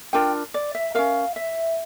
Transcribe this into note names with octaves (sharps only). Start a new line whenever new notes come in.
D4 F4 A#4 G5
D5
E5
C#4 F4 A#4 F5
E5